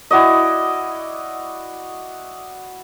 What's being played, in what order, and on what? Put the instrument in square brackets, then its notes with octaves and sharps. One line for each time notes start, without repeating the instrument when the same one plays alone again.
[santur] E4 F#4 D5 D#5